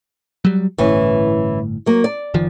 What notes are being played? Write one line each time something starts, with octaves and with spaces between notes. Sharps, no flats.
F#3 G3
G1 A2 E3 C#4
F#3 A#3
D5
F#1 D#3 F3